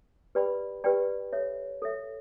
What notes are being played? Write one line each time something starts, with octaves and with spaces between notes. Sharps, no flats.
G4 B4 D5 G5 B5
G4 B4 D5 G5 B5
A4 C#5 E5
A4 C#5 E5